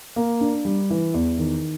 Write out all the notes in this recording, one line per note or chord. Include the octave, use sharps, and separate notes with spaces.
A#3
D4
G3
E3
E2
D#3